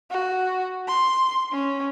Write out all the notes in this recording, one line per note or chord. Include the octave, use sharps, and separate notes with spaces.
F#4
C6
C#4